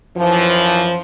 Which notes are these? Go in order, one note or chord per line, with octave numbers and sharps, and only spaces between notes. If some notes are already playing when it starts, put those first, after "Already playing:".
F#2 E3 F3